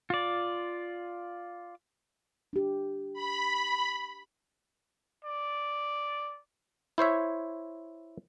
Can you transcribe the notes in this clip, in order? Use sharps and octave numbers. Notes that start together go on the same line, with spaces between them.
F4 D5
D4 G4
B5
D5
E4 C5 C#5 E5